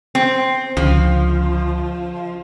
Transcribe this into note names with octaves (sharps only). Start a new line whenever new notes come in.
C4
C#2 D3 F3